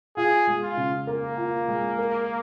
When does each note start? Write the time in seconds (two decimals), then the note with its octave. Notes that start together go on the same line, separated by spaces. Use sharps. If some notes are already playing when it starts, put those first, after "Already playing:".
0.17 F4 G#4
0.47 G#3
0.62 F4
0.77 C#3
1.07 A#3 A#4
1.37 F4
1.68 G#3
1.98 A#4